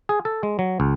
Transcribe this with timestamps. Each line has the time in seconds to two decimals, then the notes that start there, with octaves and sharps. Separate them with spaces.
0.09 G#4
0.25 A4
0.43 G#3
0.59 F#3
0.80 C#2